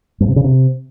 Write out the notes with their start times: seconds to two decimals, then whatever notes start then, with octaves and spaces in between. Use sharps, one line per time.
0.20 G2
0.28 C3
0.36 C#3
0.44 C3